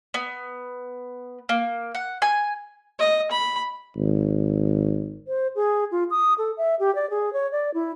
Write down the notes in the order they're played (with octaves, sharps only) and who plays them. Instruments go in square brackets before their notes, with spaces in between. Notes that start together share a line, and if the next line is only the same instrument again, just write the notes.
[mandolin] B3
A#3
F#5
G#5
[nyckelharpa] D#5
B5
[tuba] G#1
[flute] C5
G#4
F4
D#6
A4
E5
G4
D5
G#4
C#5
D5
E4